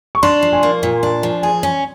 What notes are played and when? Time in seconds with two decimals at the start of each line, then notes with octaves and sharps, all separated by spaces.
0.15 C#6
0.23 D4 C6
0.43 F3
0.53 G#5
0.63 A#3
0.83 A#2
1.03 D4
1.23 F3
1.43 G#4 G#5
1.63 C#4